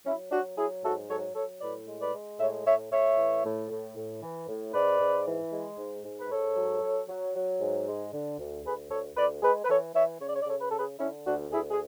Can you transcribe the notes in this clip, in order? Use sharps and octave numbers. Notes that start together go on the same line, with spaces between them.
F#3 C#4 E4
F#3 D4 F#4
F#3 E4 G#4
G#2 F#4 A4
F#3 A4 C#5
F#3 A4 C#5
A2 B4 D5
G#3
B4 D5
G#3
A2 C#5 E5
A2 C#5 E5
A2 C#5 E5
E3
A2
A2
A2
E3
A2
G#2 B4 D5
G#2
E3
G#3
G#2
G#2
B4
G#2 A4 C#5
F#3
F#3
F#3
F#3
G#2
G#3
D3
D2
D2 G#4 B4
D2 A4 C#5
D2 B4 D5
G#3 G#4 B4
B4
E3 A4 C#5
E3 C#5 E5
C#3 C#5
D5
C#5
D5
C#3 A4 C#5
B4
C#3 A4
G#4 B4
D3 C#4 E4
D2 D4 F#4
D2 E4 G#4
G#4